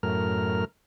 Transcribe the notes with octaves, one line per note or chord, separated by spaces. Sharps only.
F#2 A2 A#4 F6